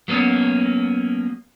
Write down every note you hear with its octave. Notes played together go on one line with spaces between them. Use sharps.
F#3 A#3 B3 C#4